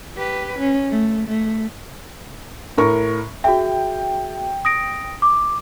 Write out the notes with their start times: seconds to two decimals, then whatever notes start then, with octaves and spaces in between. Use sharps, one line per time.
0.17 G4 B4
0.59 C#4
0.90 A3
1.28 A3
2.78 A2 A#4 C#6
3.44 F#4 G#4 E5 G5
4.65 D#6 A#6 D7
5.22 D6